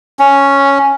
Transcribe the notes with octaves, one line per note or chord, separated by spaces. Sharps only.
C#4